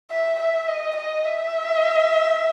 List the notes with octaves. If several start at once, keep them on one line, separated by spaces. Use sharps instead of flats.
E5
E5
D#5
D#5
E5